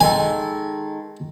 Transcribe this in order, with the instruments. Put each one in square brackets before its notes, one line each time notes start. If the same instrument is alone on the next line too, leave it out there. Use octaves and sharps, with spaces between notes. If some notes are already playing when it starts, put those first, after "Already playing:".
[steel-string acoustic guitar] D#3 G#3 A4 [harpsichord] G#5